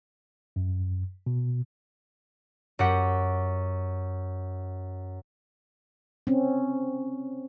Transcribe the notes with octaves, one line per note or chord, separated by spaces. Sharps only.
F#2
B2
F#2 F#4 G4 F#5
C4 C#4